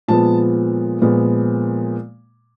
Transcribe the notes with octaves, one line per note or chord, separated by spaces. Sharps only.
A#2 F3 G#3 B3 A5
A#2 F3 G#3 B3